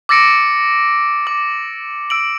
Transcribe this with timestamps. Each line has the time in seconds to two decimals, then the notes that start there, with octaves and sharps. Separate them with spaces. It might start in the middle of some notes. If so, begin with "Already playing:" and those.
0.09 D6 E6 A6 A#6 C#7 D7
1.27 D6 F#7
2.10 E6 D7 F#7